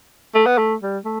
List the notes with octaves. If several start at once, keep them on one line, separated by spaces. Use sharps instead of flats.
A3
B3
A3
G3
A3